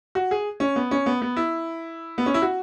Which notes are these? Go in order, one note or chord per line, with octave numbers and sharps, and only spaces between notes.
F#4
G#4
C#4
B3
C#4
B3
B3
E4
B3
C#4
E4
F#4